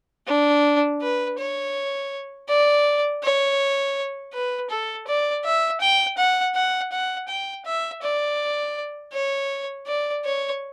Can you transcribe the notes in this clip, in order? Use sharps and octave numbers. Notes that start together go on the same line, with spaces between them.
D4
B4
C#5
D5
C#5
B4
A4
D5
E5
G5
F#5
F#5
F#5
G5
E5
D5
C#5
D5
C#5